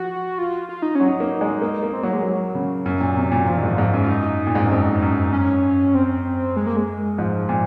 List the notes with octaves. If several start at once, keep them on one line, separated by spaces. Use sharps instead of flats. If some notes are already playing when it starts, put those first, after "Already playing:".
Already playing: F3 F#4
F4
F4
D#4
F#3 C#4
D#4
A#3
G#3
A#3
A#3
C4
F#3 A#3
G#3
F#3
C#3
F#2
A#2
C3
A#2
A#2 F3
G#2 D#3
F3
G#2
F#2
F4
D#4
A#2
G#2
F#2
F2
F#2
F#2 C#4
C4
G#3
A#3
G#3
G#2 F3
A#2